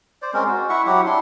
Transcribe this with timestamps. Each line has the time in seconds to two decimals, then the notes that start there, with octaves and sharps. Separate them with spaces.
0.22 C5 D5
0.34 G#3 C4 C#4 A#4
0.47 F#4
0.69 E4 E5 F#5 C#6
0.86 F#3 E4 G4 F#5
1.06 D4 E4 C6